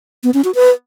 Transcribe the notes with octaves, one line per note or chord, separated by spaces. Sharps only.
B3
C#4
F#4
B4